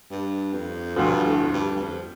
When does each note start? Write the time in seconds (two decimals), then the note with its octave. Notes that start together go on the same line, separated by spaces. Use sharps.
0.10 G2
0.53 F2
0.96 D2 G2 D3 F3 A3
1.24 A2
1.44 F2
1.53 G2
1.77 G2
1.81 F2